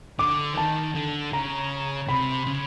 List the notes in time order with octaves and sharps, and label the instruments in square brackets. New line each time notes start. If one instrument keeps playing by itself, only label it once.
[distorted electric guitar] D3 [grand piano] D6
[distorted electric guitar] E3
[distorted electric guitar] D#3 [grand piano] A5
[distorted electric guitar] D3
[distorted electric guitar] C#3 [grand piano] A#5
[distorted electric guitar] C3 [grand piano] B5
[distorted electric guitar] C#3